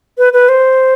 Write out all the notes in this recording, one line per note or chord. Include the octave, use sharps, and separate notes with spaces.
B4
B4
C5